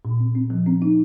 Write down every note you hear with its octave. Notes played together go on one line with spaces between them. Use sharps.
A#2
C4
C4
F3
C4
D#4